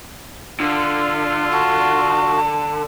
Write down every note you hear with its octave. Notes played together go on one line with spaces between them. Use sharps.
D3 F4
F#4 A5